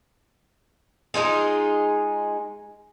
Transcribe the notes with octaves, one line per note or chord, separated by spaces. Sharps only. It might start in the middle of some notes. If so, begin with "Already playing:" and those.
G#3 D#4 F4 G#4